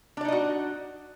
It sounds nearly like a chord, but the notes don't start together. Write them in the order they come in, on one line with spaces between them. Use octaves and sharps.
D4 D5 D#4 D#5 F#4